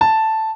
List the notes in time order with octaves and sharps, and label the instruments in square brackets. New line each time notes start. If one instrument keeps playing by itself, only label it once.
[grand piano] A5